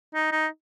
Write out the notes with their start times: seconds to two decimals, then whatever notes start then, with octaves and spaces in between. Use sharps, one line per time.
0.14 D#4
0.32 D#4